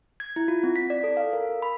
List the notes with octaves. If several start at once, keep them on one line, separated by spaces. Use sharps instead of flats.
G#6
E4
F4
C4
B6
D5
A4
F5
A#4
B5